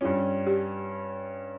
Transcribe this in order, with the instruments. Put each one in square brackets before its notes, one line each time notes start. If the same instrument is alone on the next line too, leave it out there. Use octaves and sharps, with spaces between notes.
[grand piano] G2 G3 C#4 [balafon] F4
[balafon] G4